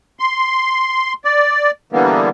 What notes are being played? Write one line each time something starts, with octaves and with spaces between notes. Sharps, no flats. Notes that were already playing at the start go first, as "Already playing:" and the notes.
C6
D5
D3 E3 G3 A#3 B3